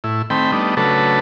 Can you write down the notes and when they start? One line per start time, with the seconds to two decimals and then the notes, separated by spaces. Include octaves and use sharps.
0.04 A2 E4
0.30 D#3 A3 C4 G5 B5
0.52 G3 A3 B3 D4 D#4
0.77 C#3 F#3 A3 D4 A4 B4